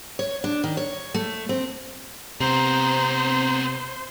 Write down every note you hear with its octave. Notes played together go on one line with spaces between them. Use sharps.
C#5
D4
D#3
C#5
A3
C4
C3 B3 C4 C5 A#5